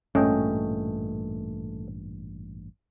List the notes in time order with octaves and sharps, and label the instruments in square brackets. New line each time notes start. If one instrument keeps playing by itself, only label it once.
[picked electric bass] A1 G2 A#2 [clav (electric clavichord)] A3 D#5 G5 [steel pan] C#4